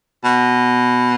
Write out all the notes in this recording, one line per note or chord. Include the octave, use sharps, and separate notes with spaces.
B2